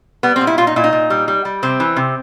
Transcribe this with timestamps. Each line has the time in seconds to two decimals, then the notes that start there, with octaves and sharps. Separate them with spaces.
0.23 G3 B3
0.36 C4
0.41 A#2
0.47 E4
0.58 A#2 F4
0.67 D#4
0.76 A#2 E4
0.84 D#4
0.93 A#2
1.10 G3
1.28 G3
1.45 G3
1.63 C3 C4
1.80 E3
1.96 C3